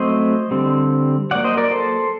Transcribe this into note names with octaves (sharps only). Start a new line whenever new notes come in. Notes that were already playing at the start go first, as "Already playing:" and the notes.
Already playing: F#3 A3 C4 C5 D#5
D3 G3 C4
F#3 A#3 D5 F#5
C5 D#5
A#4 D5
A4 C5